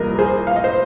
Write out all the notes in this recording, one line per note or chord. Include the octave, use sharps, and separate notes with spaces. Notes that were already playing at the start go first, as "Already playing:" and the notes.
Already playing: C2 A#2 F3 A#4 D#5
A#4
G#4 C5
F5
D#5
C5